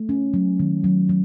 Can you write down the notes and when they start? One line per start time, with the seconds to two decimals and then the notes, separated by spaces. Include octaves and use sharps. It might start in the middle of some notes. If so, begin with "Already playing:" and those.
Already playing: A3
0.09 C#4
0.34 F#3
0.60 D#3
0.84 F#3
1.09 F#3